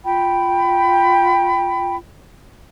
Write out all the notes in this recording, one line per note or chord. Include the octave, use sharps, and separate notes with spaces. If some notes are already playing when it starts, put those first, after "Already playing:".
F4 G5 B5